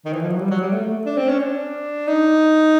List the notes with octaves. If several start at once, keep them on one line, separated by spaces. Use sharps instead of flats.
D#3
E3
F3
F#3
G3
F#3
G3
A3
A3
D4
C4
C#4
D4
D#4